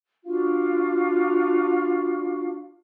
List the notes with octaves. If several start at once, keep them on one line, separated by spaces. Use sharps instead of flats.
D4 F4 F#4 F5